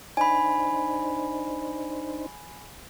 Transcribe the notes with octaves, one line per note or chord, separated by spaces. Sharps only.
D4 D#4 C5 G#5 B5